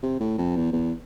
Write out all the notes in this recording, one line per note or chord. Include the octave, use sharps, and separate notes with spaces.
C3
A2
F2
E2
E2